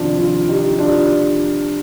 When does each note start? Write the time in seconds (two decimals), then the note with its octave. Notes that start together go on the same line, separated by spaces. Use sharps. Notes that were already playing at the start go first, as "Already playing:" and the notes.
Already playing: F2 C3 D#3 D4 F4
0.18 D4 F4
0.49 D#4 G4
0.79 D4 F4